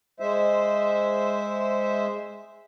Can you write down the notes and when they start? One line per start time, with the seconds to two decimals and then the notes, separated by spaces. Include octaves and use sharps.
0.20 G#3 C5 E5